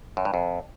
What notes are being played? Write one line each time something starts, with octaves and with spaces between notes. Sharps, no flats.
F#2
G2
F2